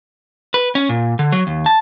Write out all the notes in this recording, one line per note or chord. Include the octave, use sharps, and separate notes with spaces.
B4
C#4
A#2
D3
F#3
D#2
A5